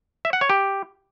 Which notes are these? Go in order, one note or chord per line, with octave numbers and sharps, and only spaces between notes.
E5
F#5
C#5
G4